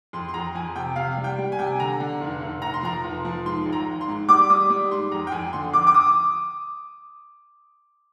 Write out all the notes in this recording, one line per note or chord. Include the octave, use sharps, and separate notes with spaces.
F2 C6
C6
F2 A#5
F2 G#5
C3 G5
C3 F5
G3
G5
G3
G#5
C3 G5
G#5
D3 A#5
D3
F1
F1
F1 A#5
C6
F3 A#5
F1
F3
G#2 C6
G#1
A#5
G#1
C6
G#2
G3 D6
G3 D#6
G3
G#2 C6
F2 A#5
G5
F2 G#5
D3 C6
F2 D6
D6
D#6